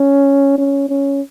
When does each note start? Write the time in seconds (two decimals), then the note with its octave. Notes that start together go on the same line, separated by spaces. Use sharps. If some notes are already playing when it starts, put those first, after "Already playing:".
Already playing: C#4
0.58 C#4
0.89 C#4